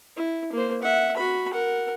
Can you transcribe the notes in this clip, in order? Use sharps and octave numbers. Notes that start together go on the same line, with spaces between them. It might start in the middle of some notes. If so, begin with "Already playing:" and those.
E4
A#3 C5
E5 F#5
F#4 B5
A#4 F#5